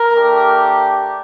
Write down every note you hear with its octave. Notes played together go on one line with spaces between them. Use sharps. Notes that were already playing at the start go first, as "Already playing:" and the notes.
Already playing: A#4
A3 D4 G4